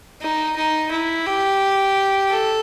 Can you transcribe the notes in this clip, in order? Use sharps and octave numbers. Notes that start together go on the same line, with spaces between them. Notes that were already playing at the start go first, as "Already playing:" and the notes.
D#4
D#4
E4
G4
A4